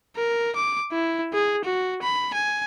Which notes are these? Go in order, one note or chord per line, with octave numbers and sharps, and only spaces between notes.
A#4
D6
E4
G#4
F#4
B5
G#5